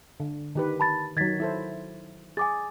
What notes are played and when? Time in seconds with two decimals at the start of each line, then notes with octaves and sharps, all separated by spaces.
0.20 D3
0.55 D#3 G4 B4
0.80 A5 B5 A6
1.17 D#3 F#3 G#6 A6 B6
1.40 E4 A4 C5
2.37 G#4 G#5 D6 A6